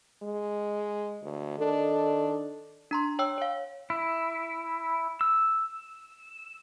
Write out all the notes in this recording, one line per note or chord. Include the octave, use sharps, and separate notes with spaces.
G#3
D2
D#3 D4 A4
D4 A#5 C6
C#5 G5 E6
C#5 F5
E4
E6